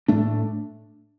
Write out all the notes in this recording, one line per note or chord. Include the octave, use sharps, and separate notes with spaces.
A2 A3 D4